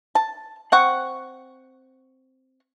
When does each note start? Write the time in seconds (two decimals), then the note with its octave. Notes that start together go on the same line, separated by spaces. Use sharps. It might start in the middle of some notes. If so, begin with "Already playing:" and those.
0.15 A5
0.72 C4 F#5 C#6